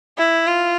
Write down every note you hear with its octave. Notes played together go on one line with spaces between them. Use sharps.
E4
F4